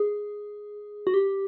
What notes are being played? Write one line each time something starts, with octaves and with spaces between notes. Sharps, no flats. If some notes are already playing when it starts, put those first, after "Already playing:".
Already playing: G#4
F#4
G4